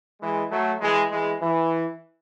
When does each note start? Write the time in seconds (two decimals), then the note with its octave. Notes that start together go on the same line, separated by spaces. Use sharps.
0.20 E3 G#3
0.50 F#3 A3
0.81 E3 G#3
1.10 E3 G#3
1.41 E3